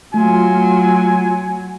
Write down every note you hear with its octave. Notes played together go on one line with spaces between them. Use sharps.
F#3 A3 F4 G#5